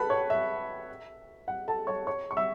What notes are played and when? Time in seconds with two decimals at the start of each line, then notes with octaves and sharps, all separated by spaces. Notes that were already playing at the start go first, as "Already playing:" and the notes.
Already playing: A4 B4 A5 B5
0.10 C#5 C#6
0.30 E5
1.48 F#5
1.68 A4 A5
1.87 C#5 C#6
2.07 C#5 C#6
2.31 C#6
2.37 E5 E6